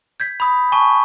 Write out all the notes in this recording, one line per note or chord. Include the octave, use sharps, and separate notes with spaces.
G6 G#6 B6
B5 D#6
G#5 A5 C#6